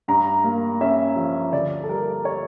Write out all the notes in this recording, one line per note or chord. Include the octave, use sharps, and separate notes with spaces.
G2 A#5
A#3
C#4 E5
F3
D2 D5
A4
G3 A#4
C#5